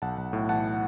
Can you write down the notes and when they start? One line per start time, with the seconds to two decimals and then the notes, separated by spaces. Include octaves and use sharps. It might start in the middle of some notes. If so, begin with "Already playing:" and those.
0.02 B1 F#5 A5
0.18 B1
0.33 A2
0.49 E3 F#5 A5